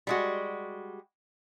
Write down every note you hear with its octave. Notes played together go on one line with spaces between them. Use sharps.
G3 G#3 F#4